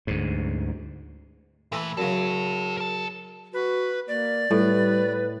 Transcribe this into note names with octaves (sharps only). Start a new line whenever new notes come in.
D2 G#2
A#2 E3 A3 B4
F#2 C#3 E4 A4
A#4 A5
F#4 B4
A#3 D5
A2 G3 B4